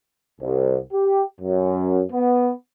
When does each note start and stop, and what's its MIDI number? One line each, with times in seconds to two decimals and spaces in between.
0.41 0.78 36
0.93 1.22 67
1.40 2.02 42
2.11 2.51 59